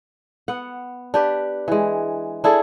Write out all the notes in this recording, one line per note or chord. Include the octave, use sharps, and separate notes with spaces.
B3 F#5
D4 G4 B4
E3 G#3
D4 E4 G#4 A4